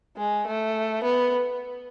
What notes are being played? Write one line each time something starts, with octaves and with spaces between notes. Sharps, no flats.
G#3
A3
B3